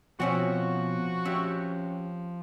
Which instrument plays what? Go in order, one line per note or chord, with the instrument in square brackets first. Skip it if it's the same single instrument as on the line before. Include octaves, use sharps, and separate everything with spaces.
[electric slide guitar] B2 F#5 [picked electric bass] F3 [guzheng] C4 C#4 E5 [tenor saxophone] F#4
[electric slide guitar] C#4 G4 [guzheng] E5